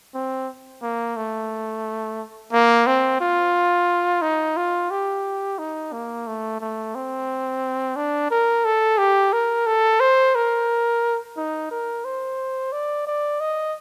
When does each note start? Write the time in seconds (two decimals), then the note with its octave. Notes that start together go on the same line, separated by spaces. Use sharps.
0.14 C4
0.82 A#3
1.16 A3
2.52 A#3
2.86 C4
3.21 F4
4.22 D#4
4.57 F4
4.90 G4
5.59 D#4
5.93 A#3
6.27 A3
6.60 A3
6.95 C4
7.96 D4
8.31 A#4
8.65 A4
8.98 G4
9.33 A#4
9.67 A4
10.00 C5
10.35 A#4
11.37 D#4
11.71 A#4
12.05 C5
12.72 D5
13.07 D5
13.40 D#5